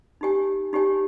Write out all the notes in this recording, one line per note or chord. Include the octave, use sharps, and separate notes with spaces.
D#4 G4 C#5 G#5
D#4 G4 C#5 G#5